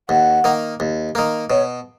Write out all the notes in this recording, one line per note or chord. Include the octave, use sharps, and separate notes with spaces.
D#2 F#5
D#3 A#3
D#2
D#3 A#3
B2 C#5